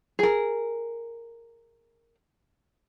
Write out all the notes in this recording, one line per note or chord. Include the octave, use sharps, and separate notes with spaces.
G#4 A#4